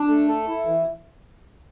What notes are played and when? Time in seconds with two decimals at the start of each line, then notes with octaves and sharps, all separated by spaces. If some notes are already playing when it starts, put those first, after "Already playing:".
Already playing: D4
0.08 A3
0.28 A4
0.48 E4
0.66 E3